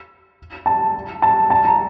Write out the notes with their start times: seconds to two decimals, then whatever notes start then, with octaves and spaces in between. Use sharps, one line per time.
0.66 A5
1.22 A5
1.50 A5
1.65 A#5